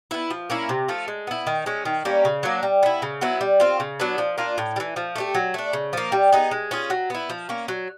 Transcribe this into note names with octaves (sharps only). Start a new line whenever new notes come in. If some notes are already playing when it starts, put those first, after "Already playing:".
B3 E4
F3
A#3 C#4 E4
C3
F3 A3
G#3
B3 E4
D#3
G#3 C#4
D#3
G3 A#3 C#4
C#3
F#3 A#3 D4
G3
B3 E4
C#3
F#3 B3 E4
G3
C4 F4
C#3
F#3 B3 D4
F3
A#3 D4 F4
A2
G3
E3
F3
A3 D4 G4
F#3
A3 D4
C#3
F3 A#3
G3
B3 D#4 G#4
G#3
C#4 F4 G#4
F#3
B3 E4
F3
A#3 C#4
F#3